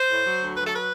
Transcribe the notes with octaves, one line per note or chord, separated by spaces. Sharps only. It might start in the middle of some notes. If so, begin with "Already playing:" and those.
Already playing: C5
A2
F#3
D2
F#3 B4
A4
B4